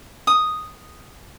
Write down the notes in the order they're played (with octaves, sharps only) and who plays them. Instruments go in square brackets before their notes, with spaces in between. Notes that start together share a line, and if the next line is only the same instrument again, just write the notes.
[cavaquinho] D#6